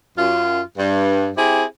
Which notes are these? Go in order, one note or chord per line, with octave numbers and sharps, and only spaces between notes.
F#2 F4
G2
C4 E4 G4 G#4